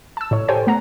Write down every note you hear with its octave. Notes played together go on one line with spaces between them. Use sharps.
A5 E6
A2 C#5
G4 A4 C5 C#5 G5 G#5
A3 B3 F#5 A#5